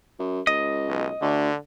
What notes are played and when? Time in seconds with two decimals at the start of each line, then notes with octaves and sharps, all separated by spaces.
0.19 F#2
0.47 C#2 D#5
0.88 B1
1.21 D2 D3